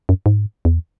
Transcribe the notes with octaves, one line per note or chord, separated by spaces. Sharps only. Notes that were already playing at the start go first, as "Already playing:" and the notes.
F#2
G#2
E2